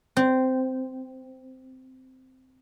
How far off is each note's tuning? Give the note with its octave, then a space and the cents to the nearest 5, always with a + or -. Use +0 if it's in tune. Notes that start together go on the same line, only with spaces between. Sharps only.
C4 -10